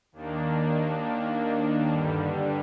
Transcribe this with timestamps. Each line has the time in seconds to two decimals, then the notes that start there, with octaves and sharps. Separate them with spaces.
0.12 D#2 D#3 A#3 D4
1.89 G2 D3 G3